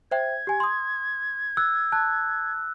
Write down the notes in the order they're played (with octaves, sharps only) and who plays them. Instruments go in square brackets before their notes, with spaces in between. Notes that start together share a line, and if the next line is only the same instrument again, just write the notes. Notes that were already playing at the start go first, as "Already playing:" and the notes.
[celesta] C5 E5 G5 [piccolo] G#6
[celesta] G4 G#5
C6 D#6
[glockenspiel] E6 [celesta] F#6
[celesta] A5 [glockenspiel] F#6